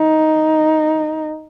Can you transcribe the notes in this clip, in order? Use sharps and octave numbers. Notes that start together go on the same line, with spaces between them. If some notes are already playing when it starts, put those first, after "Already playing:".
Already playing: D#4